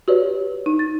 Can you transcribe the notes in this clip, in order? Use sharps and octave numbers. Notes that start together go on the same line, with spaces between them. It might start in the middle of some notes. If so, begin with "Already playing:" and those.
F#4 G4 B4 C#5 D5
D#4
A6